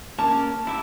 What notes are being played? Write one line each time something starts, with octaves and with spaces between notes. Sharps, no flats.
A#3 C#4 A#4 A5
E4 G4 E5